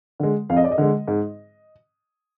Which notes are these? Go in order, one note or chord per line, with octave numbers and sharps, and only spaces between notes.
D3 G#3
F2 F5
D#5
D5
D#5
D3 G#3
G#2